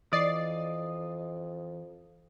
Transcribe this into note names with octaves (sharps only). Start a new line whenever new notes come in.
F2 E3 D5 D#5 A6 C7